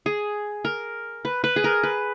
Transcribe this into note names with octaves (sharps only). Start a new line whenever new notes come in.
G#4
A#4
B4
B4
G#4
A#4
B4